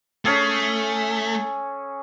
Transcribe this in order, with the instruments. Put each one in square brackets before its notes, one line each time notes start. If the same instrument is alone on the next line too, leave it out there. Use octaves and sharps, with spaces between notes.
[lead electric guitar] A3 [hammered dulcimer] C#4 G#4 A4